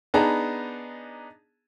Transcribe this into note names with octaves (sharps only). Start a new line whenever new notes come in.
B3 D4 D#4 G#4 A5 A#5